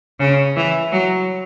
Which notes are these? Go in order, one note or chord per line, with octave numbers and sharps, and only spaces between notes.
C#3
E3
F#3